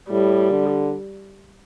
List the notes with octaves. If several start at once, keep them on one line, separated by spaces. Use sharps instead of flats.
A2 G3
D3